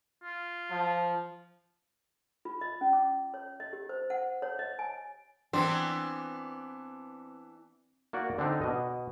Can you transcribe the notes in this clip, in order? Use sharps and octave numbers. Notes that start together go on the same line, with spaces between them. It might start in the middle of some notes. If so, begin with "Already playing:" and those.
F4
F3
F4
D#5
C#4
D6
C#5
D#5
G4
C5
F#5
C#5
D#5
G#5
E3 B3 C4 D4
A#3 F#4 D5
D3 C4 D4 D#4
B2 D#5